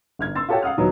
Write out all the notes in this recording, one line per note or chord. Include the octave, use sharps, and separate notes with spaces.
G1 F6 G#6
C6 E6 A6
F4 G4 A4 C#5 F#5 G5
F5 F#5 D#6 F6
D2 F3 F#3 B3 D#4